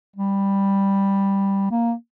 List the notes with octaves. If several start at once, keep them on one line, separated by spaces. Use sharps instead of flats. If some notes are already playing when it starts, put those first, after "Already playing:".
G3
A#3